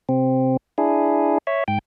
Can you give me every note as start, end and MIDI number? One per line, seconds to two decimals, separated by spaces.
0.09 0.57 48
0.09 0.57 60
0.78 1.38 62
0.78 1.38 64
0.78 1.38 68
1.47 1.64 73
1.47 1.64 76
1.68 1.79 44
1.68 1.79 79